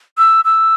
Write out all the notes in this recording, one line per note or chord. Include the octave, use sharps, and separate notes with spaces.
E6
E6